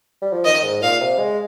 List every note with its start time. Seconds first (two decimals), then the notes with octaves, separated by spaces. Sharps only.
0.22 G3
0.33 F3
0.45 D#3 D#5
0.63 G#2
0.82 A#2 F5
1.01 C3
1.19 G#3